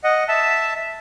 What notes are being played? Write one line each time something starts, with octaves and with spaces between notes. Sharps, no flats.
D#5 F#5
E5 A5